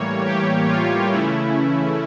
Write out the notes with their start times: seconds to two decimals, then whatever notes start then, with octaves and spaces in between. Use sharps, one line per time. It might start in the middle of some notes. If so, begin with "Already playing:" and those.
Already playing: A2 E3 G3 A#3 C#5
0.25 G4
0.68 F4
1.11 C#3 E3 A3 C#4 E4